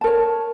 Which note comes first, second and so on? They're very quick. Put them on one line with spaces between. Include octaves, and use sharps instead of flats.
A5 A#4 C#5